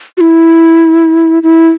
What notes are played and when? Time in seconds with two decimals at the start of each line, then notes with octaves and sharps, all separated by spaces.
0.17 F#4
0.21 E4
1.43 E4